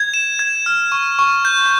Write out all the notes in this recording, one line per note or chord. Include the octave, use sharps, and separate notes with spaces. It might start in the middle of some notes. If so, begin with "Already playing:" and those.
Already playing: G#6
E7
G#6
F6
C#6
C#6
G6